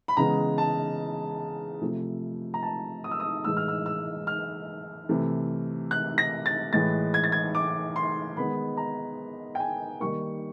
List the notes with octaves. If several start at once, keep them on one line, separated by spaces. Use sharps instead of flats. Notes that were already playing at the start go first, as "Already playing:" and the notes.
B5
C#3 E3 G#3 B3 A#5
A5
C3 F3 A3
A#5
A5
D#6
E6
D#6
A2 E3 G#3 E6
F6
E6
E6
F6
C3 E3 A3
F#6
A#6
A6
A2 E3 G#3 A6
G#6
A6
G#6
D6
C6
D#3 G#3 B3 B5
A#5
G5
G#5
D#3 G3 A#3 C#6